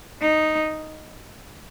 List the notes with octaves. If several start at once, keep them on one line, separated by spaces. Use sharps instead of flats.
D#4